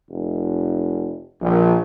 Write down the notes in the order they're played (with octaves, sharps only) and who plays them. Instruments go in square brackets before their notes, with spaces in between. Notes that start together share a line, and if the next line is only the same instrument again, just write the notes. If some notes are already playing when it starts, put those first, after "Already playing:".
[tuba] F1
[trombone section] A#1 [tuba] F3